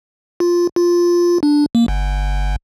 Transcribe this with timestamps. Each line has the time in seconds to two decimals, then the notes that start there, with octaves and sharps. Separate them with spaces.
0.40 F4
0.76 F4
1.43 D4
1.75 A#3
1.88 G1